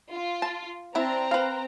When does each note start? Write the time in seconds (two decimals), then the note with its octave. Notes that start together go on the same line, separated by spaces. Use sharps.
0.12 F4
0.42 A5
0.95 C4 D4 E4 A#5
1.31 B4 F5